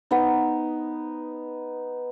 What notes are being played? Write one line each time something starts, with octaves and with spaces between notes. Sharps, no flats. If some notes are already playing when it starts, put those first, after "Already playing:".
B3 D#4